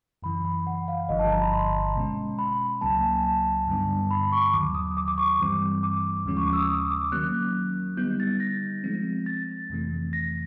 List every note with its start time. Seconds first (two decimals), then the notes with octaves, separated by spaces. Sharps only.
0.22 F#2 C#3 E3 B5
0.45 B5
0.67 F#5
0.88 F5
1.09 G1 G2 D3 F3 D#5
1.19 A5
1.31 A#5
1.41 B5
1.53 C6
1.95 B2 G#3 C#4
2.39 B5
2.81 C#2 C#3 F#3 A#3 A5
3.03 G#5
3.24 A5
3.67 G2 D3 G3 B3 D4
4.11 B5
4.32 C#6
4.53 D#2 D#3 F#3 D6
4.75 D#6
4.97 D6
5.08 D6
5.18 C#6
5.28 D6
5.40 G2 E3 G3 C4
5.83 D6
6.26 D#2 C#3 F3 G#3 C#4
6.37 C#6
6.47 D6
6.53 E6
6.57 D#6
6.69 D#6
6.91 D6
7.12 D#3 F#3 A#3 C#4 F#6
7.97 D3 G3 B3 D#4 G6
8.20 A6
8.40 A#6
8.84 F3 G#3 C4
9.26 A6
9.70 F2 C3 E3 A3
10.13 A#6